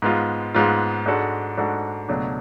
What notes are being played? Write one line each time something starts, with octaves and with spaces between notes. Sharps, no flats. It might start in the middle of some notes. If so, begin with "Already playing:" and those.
G#2 G#3 B3 F4
G#2 G#3 B3 F4
G#2 G#3 D4 F#4 A4
G#2 G#3 D4 F#4 A4
C#2 B2 F#3 A3 D4